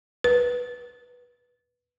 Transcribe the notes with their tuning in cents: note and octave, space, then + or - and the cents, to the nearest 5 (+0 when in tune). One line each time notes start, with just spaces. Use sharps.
B4 -15